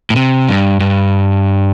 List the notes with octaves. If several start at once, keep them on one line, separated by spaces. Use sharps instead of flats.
A2
C3
G2
G2